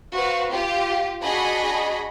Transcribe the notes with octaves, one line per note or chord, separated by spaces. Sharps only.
F#4 B4 C5 F5
F4 G4
D4 F#4 G#4 D#5 B5